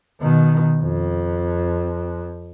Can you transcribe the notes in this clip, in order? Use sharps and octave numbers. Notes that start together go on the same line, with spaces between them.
B2 D#3
F2